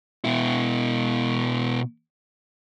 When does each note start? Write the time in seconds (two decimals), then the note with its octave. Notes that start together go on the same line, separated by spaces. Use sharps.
0.25 B2 E4